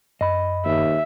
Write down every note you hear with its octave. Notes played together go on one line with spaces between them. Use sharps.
F#2 D#5 B5
D#2 E5